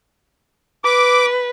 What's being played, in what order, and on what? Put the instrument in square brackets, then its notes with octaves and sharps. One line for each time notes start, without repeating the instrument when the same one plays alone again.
[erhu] B4 [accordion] D6